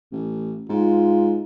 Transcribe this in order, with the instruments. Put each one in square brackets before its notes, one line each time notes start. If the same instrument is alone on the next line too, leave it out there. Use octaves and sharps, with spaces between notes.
[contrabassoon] A1
[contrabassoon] G#2 [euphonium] F4